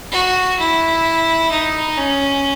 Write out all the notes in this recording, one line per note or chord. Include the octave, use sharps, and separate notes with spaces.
F#4
E4
D#4
C#4